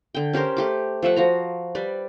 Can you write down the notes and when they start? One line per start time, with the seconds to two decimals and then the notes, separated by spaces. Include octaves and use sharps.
0.15 D3 G5
0.33 C#4 G4 A#4 C5
0.57 A3 G4 D6
1.02 F3 A3 E5 F#5
1.16 F3 F#4 A#5
1.75 G3 B4 D5